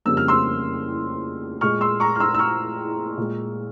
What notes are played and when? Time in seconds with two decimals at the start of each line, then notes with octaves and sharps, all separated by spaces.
0.05 F2 C#3 G3 A#3 E6
0.17 F6
0.28 C6 E6
1.61 A#2 G#3 C#6 F6
1.81 C6 E6
2.00 A#5 C#6
2.16 F6
2.20 C6 E6
2.34 E6
2.39 C#6 F6
3.17 A#2 G#3